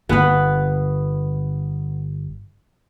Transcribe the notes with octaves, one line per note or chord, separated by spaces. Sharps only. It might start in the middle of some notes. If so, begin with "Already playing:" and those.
G1 B3 B4